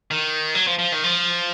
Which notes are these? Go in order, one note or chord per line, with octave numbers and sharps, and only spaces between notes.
D#3
F#3
F3
F3
D#3
F3